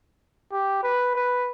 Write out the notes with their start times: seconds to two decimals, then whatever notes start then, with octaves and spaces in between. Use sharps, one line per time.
0.52 G4
0.83 B4
1.15 B4